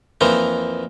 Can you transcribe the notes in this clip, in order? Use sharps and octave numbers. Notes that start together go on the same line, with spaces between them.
F2 E3 F3 A#3 D#4